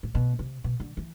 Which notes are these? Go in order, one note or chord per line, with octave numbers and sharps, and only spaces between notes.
A2
B2
C3
B2
D3
E3